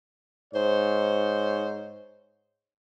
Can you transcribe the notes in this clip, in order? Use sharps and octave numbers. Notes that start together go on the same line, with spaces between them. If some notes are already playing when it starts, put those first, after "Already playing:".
G#2 C5 C#5